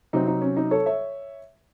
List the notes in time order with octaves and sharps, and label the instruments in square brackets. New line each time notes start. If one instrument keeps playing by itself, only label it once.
[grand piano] C3 F#3 C4 D#4
D#4
C#4
D#4
A4 C#5
C#5 E5